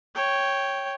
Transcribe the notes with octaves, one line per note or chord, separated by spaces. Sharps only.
C#5 G5